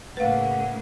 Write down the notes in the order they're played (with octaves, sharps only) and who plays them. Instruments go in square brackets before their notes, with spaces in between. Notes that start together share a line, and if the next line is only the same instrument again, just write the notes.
[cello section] A2 C#3 A#3 [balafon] B4 F5 [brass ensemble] F#5